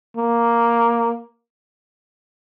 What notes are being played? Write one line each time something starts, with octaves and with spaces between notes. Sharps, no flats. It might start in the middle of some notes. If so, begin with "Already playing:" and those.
A#3